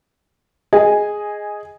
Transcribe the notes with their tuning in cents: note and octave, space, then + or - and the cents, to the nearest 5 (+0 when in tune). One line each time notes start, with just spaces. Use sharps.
G#4 +0 D#5 +0 G#5 -10